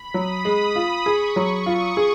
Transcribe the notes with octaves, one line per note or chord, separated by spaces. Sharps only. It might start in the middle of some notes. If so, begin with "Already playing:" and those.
Already playing: B5
F#3 D#6
G#3 B5
F4
G#4 C#6
F#3 C#6
F4 D#6
G#4